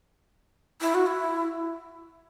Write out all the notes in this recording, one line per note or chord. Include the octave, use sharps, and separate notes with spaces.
E4
F#4
E4